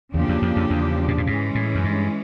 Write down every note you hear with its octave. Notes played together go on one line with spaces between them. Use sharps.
E2 C#3 F3 A#3 D4 G4
E2
F2
F2
E2
A#2
A2
G#2 E3 G#3 C#4
A2
F#2
G2